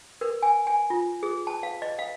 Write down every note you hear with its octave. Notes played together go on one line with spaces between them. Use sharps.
A#4
G#5
G#5
F4
G#4
A5
F5
D#5
F5